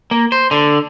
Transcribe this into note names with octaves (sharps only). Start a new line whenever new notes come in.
A#3
C5
D3